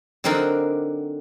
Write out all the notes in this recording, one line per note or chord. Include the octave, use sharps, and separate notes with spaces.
D3 F#3 C4 D#4 A#4 D5